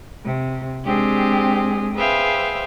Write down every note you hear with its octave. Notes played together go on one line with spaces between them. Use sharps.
C3
G#3 C4 D4 G4 G#4
G#4 B4 C5 E5 F5 G5